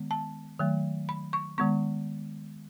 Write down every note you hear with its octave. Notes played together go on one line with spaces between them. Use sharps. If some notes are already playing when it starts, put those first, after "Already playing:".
Already playing: D#3 G#3 B3
A5
D#3 F#3 A3
B5
C#6
D#3 G#3 B3 C#6